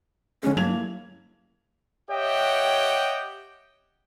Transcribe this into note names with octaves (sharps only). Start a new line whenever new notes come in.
D3 G#3 C#4
G2 F#3 A#3 G#6 F7
E4
G4 C#5 D#5 E5 F#5 G5